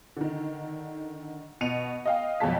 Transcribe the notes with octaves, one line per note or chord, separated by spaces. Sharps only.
D3 D#3
B2 C#7 D#7 F7
D#5 F5 G5
F2 B2 F#3 G#3 A5 B6